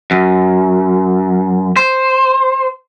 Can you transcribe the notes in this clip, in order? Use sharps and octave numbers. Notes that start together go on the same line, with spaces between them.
F#2
C5